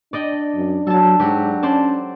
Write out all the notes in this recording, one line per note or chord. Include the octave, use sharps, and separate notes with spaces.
D4 D5 D#5 G5
F#2
F#3 A4 A5
G#2 F#3 F#4 G4
C#4 C5 D5 A5